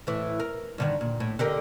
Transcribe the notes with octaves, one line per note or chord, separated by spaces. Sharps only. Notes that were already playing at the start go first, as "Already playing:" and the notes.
A2 E3
A#4
G2 D3 D#3
A#2
A2
D3 G4 A#4